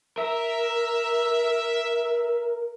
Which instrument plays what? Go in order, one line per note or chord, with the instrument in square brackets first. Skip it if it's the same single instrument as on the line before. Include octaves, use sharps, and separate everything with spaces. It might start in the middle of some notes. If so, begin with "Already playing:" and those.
[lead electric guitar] A#4 [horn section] E5